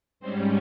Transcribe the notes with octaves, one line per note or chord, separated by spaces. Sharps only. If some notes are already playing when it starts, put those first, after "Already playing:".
G#2 G3 C4 C#4 C5